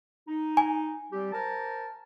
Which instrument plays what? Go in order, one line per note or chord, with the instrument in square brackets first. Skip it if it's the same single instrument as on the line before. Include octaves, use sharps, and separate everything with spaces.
[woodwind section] D#4
[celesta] G#5
[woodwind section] G3 C4 G4
A#4 C5 A5